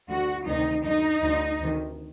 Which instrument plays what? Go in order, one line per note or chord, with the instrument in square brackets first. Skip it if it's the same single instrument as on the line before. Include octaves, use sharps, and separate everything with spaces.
[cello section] D2 D3 F#4
D2 C3 D#3 D#4
F#2 D3 D#4
D2 D3
D2 C3 D#3